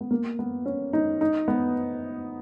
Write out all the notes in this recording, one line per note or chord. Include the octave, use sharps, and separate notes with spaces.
B3
A#3
B3
C#4
D#4
D#4
B3